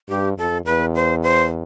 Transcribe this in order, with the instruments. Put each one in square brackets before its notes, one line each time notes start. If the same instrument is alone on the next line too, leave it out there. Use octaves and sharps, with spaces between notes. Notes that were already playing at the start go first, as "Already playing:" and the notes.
[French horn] G2 [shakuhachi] G4
[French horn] F2 [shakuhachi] A4
[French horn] E2 [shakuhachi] B4
[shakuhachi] C5
C5